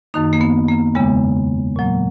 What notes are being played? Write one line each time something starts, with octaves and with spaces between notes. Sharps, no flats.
F#2 D#3 A#3 D#4
A#3
B3
A#3
E2 C#3 G#3 B3
A#2 F#3 A#3